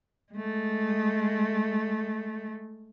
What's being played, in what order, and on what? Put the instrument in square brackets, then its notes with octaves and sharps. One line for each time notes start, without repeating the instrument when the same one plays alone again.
[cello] G#3 A3